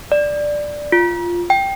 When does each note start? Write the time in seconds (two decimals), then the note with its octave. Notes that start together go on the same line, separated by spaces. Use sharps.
0.12 D5
0.92 F4
1.50 G5